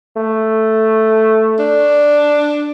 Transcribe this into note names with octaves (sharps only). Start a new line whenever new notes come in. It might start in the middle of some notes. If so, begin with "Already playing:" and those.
A3
D4